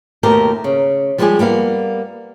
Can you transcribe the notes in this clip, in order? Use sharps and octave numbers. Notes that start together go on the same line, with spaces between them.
D#2 B2 A3 G4 A#4
C#3
F3 G3 G#3 E4 G4 G#4
G3 A#3 B3 F5